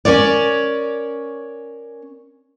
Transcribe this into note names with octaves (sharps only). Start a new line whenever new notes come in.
C#4 A#4 C#5 D5